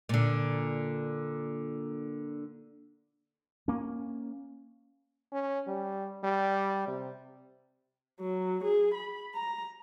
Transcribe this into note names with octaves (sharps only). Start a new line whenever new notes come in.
A#2 D3
A#3 C#4
C#4
G3
G3
C3
F#3
G#4
B5
A#5